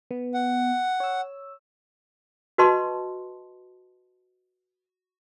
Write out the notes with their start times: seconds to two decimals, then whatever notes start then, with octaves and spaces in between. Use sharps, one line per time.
0.11 B3
0.34 F#5
1.00 C#5 E6
2.58 F#4 B4 D#5 A5 C6 C#6